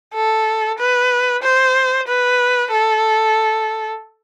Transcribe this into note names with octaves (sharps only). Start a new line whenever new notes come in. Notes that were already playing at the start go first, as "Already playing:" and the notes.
A4
B4
C5
B4
A4